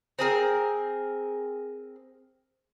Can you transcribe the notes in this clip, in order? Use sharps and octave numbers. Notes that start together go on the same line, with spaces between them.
C4 G#4 A#4